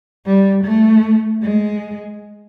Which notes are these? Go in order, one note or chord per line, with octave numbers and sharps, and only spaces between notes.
G3
A3
G#3